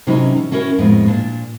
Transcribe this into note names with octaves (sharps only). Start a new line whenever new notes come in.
C3 E3 F#3 C#4 D#4
C#4
E3 C#4 E4 F#4 A#4
F2 A2 G#3 B3
A#2 D4